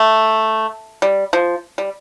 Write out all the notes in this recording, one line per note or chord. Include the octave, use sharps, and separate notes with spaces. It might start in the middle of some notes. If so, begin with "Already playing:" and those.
Already playing: A3
G3
F3
G3